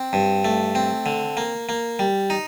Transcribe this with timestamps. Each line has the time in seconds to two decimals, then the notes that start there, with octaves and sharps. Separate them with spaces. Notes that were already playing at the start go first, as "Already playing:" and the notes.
Already playing: C4
0.13 G2
0.45 A3
0.75 C4
1.06 D3
1.37 A#3
1.69 A#3
1.99 G3
2.30 D#4